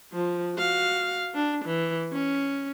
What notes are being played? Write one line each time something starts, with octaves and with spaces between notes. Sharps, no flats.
F3
F#4 F5
D4
E3
C#4